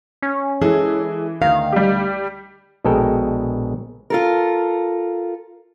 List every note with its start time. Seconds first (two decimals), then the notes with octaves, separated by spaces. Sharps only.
0.22 C#4
0.62 E3 G#3 G#4 A4
1.42 D2 D#3 F5
1.72 G3 G4
2.85 A#1 B2 G#3 A4 A#4 G5
4.10 F4 A4 A#4